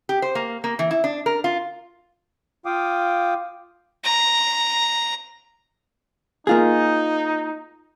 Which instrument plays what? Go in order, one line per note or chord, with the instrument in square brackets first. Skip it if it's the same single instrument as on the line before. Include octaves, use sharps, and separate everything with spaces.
[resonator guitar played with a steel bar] G4
C5
A#3
A#3
E3
E4
D4
A#4
F4
[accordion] F4 F5 G5 D6 D#6
[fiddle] A#5
[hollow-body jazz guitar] A#3 F4 G#4 [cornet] D#4